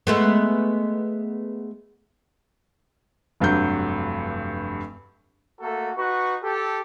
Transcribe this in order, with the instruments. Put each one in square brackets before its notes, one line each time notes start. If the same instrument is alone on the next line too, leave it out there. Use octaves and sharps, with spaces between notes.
[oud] G#3 A3 B3
[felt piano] F1 G2 F#3 G6
[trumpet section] A3 A#3 F#4 A4
D#4 F#4 B4 C#6
G4 A4